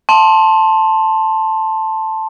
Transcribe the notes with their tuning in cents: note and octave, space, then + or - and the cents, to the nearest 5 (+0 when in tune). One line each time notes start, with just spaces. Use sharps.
A5 +0 C6 +15